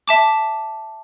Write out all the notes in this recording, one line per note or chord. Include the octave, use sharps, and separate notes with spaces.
E5 A5 D6